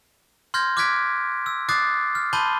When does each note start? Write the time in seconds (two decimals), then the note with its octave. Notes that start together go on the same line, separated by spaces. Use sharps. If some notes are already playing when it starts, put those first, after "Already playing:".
0.54 C6 F6 G6 G#6 A#6
0.77 D6 F6 F#6 G#6 B6 D7
1.46 E6
1.69 D6 D#6 F#6 A6 C7
2.15 F6
2.33 A5 B5 C6 G6 D#7 G7